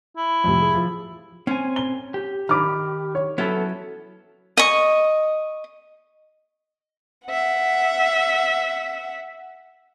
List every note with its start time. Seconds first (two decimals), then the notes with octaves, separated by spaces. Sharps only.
0.17 E4
0.44 F2 A2 C3
0.61 G#4
0.75 F3
1.47 C4 C#4 G#5
1.76 G7
2.14 G4
2.49 D#3 B5 D6 F6
3.15 C#5
3.38 F#3 B3 C#4 E4 A4
4.57 D#5 C#6
7.26 E5 F#5